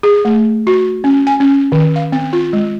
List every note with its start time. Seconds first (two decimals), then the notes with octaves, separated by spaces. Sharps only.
0.03 G#4
0.25 A3
0.67 F#4
1.04 C#4
1.27 G#5
1.40 C#4
1.72 D#3
1.96 F5
2.12 C4
2.33 F4
2.53 G#3